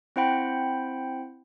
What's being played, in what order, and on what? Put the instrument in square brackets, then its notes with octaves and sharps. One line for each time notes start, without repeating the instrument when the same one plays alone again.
[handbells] C4 E4 C5 F#5 G5 B5